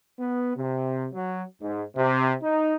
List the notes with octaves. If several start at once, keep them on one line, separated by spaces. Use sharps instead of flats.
B3
C3
F#3
G#2
C3
D#4